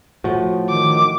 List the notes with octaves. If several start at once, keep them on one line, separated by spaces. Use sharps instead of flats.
A2 F3 F#4
D#3 D6